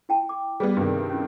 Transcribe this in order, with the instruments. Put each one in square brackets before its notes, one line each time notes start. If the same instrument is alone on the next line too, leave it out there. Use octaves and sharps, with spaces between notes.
[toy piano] E4 G5 A5
D6
[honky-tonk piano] G3 B3 [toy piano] G#4 B4 D5
[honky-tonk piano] G2 C3 D#3
[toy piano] C#4 E4